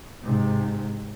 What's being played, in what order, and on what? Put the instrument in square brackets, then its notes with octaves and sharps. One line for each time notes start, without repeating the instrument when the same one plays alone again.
[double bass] G#2 C3